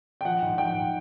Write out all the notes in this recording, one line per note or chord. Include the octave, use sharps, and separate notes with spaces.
G5
F3 F#5
G#2
F3 G5
G#2